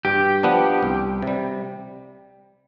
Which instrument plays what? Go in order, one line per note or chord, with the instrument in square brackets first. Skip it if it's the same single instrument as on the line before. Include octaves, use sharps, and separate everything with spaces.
[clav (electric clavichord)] G2 [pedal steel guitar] G4
[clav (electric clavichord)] F3 B3 D4
C2
C3 G3